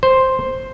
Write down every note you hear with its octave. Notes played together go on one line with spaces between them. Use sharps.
C5